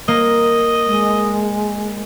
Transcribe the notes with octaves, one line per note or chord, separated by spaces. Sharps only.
A#3 D#5
G#3